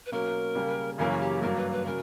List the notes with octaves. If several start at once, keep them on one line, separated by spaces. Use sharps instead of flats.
B4
B2 F#3 A#3 C#4 A#4
C#3 G3 A#3
F#2 C#3 E3 A#3 C#4 A#4
F#4
G4
G2 F#3 A#3 A#4
B4
B4
C#3 F#3 A#4